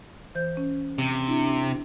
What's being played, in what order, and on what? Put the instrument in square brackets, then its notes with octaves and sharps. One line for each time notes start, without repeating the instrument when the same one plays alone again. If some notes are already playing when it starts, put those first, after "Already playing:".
[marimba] E3 C5 G6
C#4
[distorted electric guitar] C3
[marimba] D4 E4